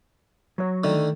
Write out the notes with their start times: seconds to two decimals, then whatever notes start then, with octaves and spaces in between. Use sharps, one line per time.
0.58 F#3 C#5
0.84 D3 D#3 A3